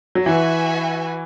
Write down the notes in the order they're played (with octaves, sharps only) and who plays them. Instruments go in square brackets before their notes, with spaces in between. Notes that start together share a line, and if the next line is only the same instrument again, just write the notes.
[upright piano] F#3
[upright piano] E3 [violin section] F#4 B4 E5 G#5